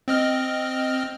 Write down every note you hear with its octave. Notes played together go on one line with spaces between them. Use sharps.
C4 D#5 F6